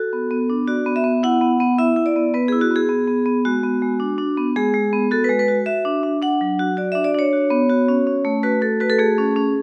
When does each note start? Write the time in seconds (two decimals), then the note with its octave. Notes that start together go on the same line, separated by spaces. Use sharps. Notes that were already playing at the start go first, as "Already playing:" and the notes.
Already playing: F#4 A4
0.13 B3
0.31 B3
0.50 D4
0.67 F#4 D5
0.86 B3
0.96 E5
1.04 B3
1.23 E4 F#5
1.41 B3
1.60 B3
1.78 E4 E5
1.96 E4
2.06 D5
2.16 B3
2.34 B3 B4
2.48 E4 G#4
2.61 F#4
2.71 B3
2.76 G#4
2.89 B3
3.08 B3
3.26 B3
3.45 G#3 F#4
3.63 B3
3.82 G#3
4.00 D4
4.18 D4
4.37 B3
4.56 G#3 G#4
4.74 G#3
4.93 B3
5.11 F#4 A4
5.24 G#3 B4
5.39 B4
5.48 F#4
5.66 F#4 E5
5.85 D4
6.03 D4
6.22 D4 F#5
6.41 F#3
6.59 F#4
6.77 F#4 D5
6.92 D4 E5
7.04 D5
7.14 D4 C#5
7.33 F#4
7.51 B3
7.70 F#4
7.88 C#4
8.07 C#4
8.25 A3
8.43 F#4 B4
8.62 A3 A4
8.80 F#4 B4
8.90 A4
8.99 A3 G#4
9.18 C#4
9.36 C#4